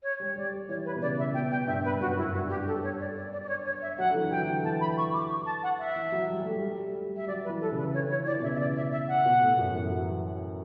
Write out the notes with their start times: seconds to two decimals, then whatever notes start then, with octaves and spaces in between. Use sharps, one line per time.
0.03 C#5
0.20 G3
0.36 G3 D5
0.69 E3 C#5
0.85 B4
0.95 B2
1.02 C#3 D5
1.19 E5
1.34 B2 G5
1.51 G5
1.67 G2 E5
1.85 B4
2.00 F#2 F#4
2.17 E4
2.23 G2
2.34 F#4
2.45 G2 G4
2.67 A4
2.84 C#5
3.00 D5
3.16 D5
3.33 D5
3.44 D5
3.49 C#5
3.65 C#5
3.82 E5
3.99 F#3 F#5
4.11 D3
4.15 E3
4.31 F#3 G5
4.47 E3
4.64 E3 A5
4.81 B5
4.98 C#6
5.14 D6
5.30 C#6
5.46 A5
5.63 F#5
5.79 E5
5.96 E3
6.12 F#3
6.29 G3
6.41 G3
6.45 A3
6.62 G3
6.95 G3
7.16 E5
7.28 F#3 D5
7.44 B4
7.50 E3
7.61 A4
7.72 C#3
7.78 B4
7.94 D3 C#5
8.10 E3 C#5
8.26 E3 D5
8.39 B2
8.43 C#3 E5
8.55 E5
8.60 D5
8.76 E5
8.92 E5
9.08 F#5
9.25 B2
9.42 A2
9.58 F#2
9.75 E3
9.91 F#3